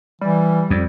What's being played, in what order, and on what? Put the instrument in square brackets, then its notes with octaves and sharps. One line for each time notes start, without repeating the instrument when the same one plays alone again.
[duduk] E3 [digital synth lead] G3
[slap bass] F2